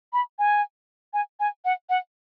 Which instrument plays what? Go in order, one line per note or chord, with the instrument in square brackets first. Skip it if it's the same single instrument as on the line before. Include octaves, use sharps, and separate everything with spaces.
[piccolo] B5
G#5
G#5
G#5
F#5
F#5